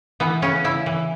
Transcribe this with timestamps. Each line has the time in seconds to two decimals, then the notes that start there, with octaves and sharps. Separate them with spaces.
0.20 E3 B3
0.42 C#3 C#4
0.64 C#3 E4
0.86 E3